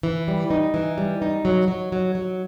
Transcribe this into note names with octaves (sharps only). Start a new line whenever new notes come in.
E3
G3
D#4
E3
G3
D#4
F#3
F#3
F#3
F#3